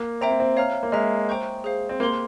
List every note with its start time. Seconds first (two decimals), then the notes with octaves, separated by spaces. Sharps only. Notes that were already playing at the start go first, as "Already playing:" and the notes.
Already playing: A#3
0.21 C4 C5 E5 G5 A#5
0.31 A#3
0.40 C4
0.57 C#5 F5 A#5 F6
0.83 A#3
0.92 G#3 E5 A#5 F6
1.29 C5 G5 A#5 C#6 G6
1.64 G#4 C5 F5
1.89 C4
2.00 A#3 G4 C5 G5 C6